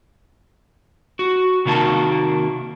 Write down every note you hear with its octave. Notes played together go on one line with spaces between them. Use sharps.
F#4
C3 D#3 A#3 F#4 A5